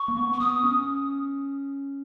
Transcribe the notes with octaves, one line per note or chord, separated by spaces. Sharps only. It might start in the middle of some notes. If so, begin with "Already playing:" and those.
Already playing: C#6
A#3
B3
C#6
B3 D#6
C#4